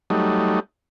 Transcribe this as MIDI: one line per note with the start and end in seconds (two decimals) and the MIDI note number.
0.10 0.60 54
0.10 0.60 55
0.10 0.60 57
0.10 0.60 63